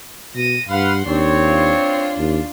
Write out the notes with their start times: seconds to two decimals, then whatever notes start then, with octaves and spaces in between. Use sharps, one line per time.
0.35 B2 A#6 D#7
0.69 G2 B4 F5 F#5 C6
1.06 D#2 C4 D4 C#5
1.43 D4 F4
2.18 D#2